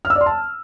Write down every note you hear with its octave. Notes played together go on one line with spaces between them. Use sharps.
F6
E6
D5
C6
A5